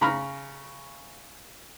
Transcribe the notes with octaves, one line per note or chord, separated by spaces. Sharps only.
C#3 A#5 B5 F6